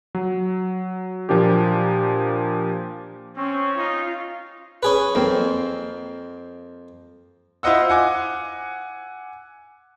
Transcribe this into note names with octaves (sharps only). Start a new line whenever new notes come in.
F#3
A#2 F3 A#3 D4 G4
C4 C#4 C#6
D#4 F4
C#4 G#4 B4
F2 A#3 C4
E4 F4 C5 D#5 F#5 E6
F#5 G#5 D6